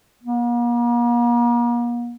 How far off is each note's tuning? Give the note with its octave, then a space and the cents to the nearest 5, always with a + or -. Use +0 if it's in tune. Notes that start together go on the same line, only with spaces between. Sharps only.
A#3 +40